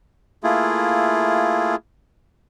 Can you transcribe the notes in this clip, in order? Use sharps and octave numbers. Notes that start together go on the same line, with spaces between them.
A3 A#3 E4 F4 G#4